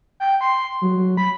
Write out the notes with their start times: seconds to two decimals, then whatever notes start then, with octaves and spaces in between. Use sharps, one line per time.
0.20 G5
0.41 C6
0.82 F#3
0.97 F#3
1.17 B5